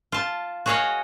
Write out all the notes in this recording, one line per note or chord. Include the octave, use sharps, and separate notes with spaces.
F4 A5
F#4 G#4 C#5 D#5 F5 F#5